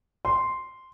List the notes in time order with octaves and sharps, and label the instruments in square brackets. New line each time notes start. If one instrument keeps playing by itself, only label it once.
[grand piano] C6